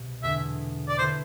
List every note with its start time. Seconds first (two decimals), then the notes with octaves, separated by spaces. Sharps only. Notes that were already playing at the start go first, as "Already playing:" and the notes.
Already playing: C2 B2
0.23 E2 D3 G#3 B3 D4 E5
0.88 D5
0.98 D3 A3 E4 B4 C5